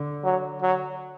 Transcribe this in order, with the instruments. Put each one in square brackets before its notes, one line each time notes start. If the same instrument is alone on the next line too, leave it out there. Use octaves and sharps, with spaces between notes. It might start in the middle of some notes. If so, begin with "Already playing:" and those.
Already playing: [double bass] D3
[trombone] F#3
F#3